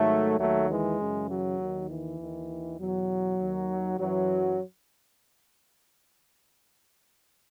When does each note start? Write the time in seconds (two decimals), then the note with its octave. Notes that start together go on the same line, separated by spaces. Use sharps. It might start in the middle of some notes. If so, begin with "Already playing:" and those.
Already playing: G#2 D#3 F#3 A3
0.40 D#2 D#3 F#3 A3
0.70 E3 G#3
1.00 F#2 C#3 E3
1.29 F#3
1.61 D#2 D#3
1.90 E3
2.20 D#2 D#3
2.80 E2 B2 F#3
3.40 D#2 D#3
4.00 F#2 E3 F#3